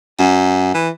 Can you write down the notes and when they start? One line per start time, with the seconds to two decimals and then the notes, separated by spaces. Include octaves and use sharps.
0.19 F#2
0.74 E3